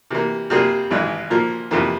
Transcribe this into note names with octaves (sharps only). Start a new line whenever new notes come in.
C3 E3 A#3
C3 G3 A#3 F4 G#4
G#1 G2 E3 G#3
A#2 F3 A#3
F2 C3 E3 A#3 F4